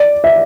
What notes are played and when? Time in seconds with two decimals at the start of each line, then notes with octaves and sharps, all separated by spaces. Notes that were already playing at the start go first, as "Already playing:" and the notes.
Already playing: D5
0.24 E5